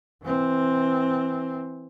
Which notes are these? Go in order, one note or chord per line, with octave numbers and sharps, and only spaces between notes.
E3 C4